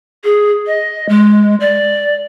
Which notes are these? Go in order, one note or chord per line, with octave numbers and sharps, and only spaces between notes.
G#4
D#5
G#3
D5